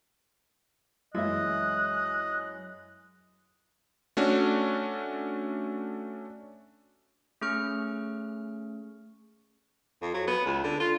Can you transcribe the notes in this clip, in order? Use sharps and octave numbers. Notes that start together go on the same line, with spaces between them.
F#2 E3 G#3 E4 D#5 E5 F#6
A3 C#4 D4 F#4
A3 C#4 G#4 C#6 F6
F2
F#3
B3
C#2
D3
F4